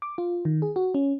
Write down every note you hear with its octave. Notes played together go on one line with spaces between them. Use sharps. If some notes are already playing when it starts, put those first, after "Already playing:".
D6
F4
D#3
G#4
F#4
C#4